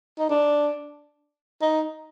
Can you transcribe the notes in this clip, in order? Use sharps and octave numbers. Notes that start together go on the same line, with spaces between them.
D#4
D4
D#4